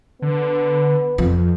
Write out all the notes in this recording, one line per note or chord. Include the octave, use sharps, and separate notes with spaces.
D3 B3
F2 F3